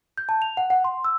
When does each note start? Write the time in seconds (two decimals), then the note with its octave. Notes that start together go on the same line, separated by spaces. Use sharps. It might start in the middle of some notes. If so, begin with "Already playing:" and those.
0.18 G6
0.29 A5
0.42 F7
0.57 F#5
0.70 F#5
0.84 C6
1.04 E6